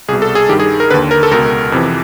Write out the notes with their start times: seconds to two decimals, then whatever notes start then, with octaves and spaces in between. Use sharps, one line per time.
0.08 C2 G#4
0.12 B2
0.22 A4
0.35 G#4
0.49 G2 D#3 G4
0.60 G#4
0.80 A#4
0.90 D#2 D3 B4
1.11 A#4
1.23 A4
1.31 C#2 B2 A#4
1.72 F2 C3 E3